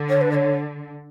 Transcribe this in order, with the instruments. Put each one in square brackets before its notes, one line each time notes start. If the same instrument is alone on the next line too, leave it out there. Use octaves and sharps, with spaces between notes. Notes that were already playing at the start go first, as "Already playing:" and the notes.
Already playing: [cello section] D3
[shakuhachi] C#5
B4
D5
C#5